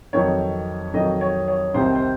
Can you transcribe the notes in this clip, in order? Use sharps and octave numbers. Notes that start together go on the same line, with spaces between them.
F2 D#3 F#3 C#5
F2 D#3 F#3 D#5
C#5
C#5
C2 C3 D#3 C5
C5